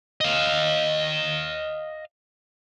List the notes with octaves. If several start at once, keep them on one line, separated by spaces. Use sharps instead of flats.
D#5 F5